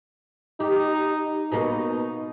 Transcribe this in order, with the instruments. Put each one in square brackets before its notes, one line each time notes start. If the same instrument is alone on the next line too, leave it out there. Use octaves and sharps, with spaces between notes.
[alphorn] D#4 [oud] G4
[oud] B2 A#3 [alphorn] D#4